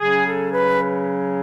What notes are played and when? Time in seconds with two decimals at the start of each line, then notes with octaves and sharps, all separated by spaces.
0.01 C#3 F#3 C#4 G#4
0.26 A4
0.52 B4